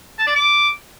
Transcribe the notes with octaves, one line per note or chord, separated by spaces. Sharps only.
A5
D5
D6